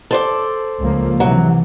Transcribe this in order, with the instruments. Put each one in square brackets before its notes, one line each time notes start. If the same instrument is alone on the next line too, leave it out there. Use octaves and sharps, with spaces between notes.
[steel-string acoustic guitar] A4 C5 D5
[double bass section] C#2 F3 A#3
[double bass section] C3 E3 [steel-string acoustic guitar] F#3